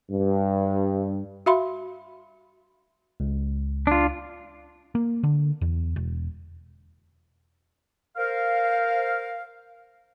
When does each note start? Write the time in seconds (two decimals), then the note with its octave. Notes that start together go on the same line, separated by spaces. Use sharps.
0.10 G2
1.46 F#4 E5 F5 B5 C6
3.20 C#2
3.87 D4 F4
4.95 A#3
5.23 D3
5.61 E2
5.96 E1
8.17 A#4 C5 F5